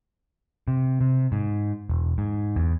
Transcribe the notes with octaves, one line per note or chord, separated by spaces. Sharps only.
C3
C3
G#2
E1
G#2
E2